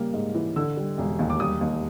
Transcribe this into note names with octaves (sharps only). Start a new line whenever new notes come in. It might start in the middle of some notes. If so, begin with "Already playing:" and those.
Already playing: C#3 G3 A#3
G#2
E3
D3 E6
G3
E1
D#2
D6
G3 D#6
D#2